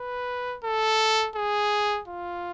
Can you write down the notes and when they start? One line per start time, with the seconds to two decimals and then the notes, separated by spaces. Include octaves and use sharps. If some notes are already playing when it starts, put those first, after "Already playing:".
Already playing: B4
0.64 A4
1.36 G#4
2.08 F4